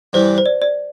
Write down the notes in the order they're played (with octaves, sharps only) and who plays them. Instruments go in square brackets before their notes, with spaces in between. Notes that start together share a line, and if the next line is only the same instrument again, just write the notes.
[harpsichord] G2 E3 G3 [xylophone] C5
[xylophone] C5
D5
D5